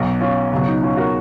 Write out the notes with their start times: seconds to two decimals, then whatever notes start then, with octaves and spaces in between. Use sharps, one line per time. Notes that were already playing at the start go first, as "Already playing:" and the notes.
Already playing: B1 B2 F#3
0.21 C#4 F4
0.52 C#2 B2 F#3
0.67 D#4
0.83 C#4 F4
0.97 F#4 A#4